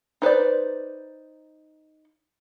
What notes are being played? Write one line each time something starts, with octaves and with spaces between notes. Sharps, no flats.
D#4 B4 C5 D5